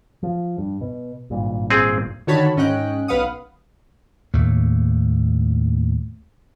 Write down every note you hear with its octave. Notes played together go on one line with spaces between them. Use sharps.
F3
G2
B2
G#1 G2 A#2
C4 G#4
D3 D#3 F#4 C#5 A5 B5
G#2 C#4 D#5 G5 F#6
B1 B4 F5 F#5 D#6
D#2 A2 A3 A#3